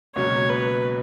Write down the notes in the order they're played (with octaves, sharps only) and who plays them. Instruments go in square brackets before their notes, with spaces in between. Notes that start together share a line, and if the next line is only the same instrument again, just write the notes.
[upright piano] C#2 B2 F#3 A#3 C#4 [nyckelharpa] C#5
[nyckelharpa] B4